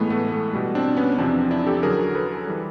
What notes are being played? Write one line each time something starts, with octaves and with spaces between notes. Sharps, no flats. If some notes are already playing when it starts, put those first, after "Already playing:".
Already playing: A2 E3 G#3 A3 B3
A3 B3
A3
B2 G3
C4 D4
B3 C#4
E2 C3 F3 C4 D4
D4 E4
G4 A4
F#2 D3 F#3 G#4 A#4
A4 B4
E3 G3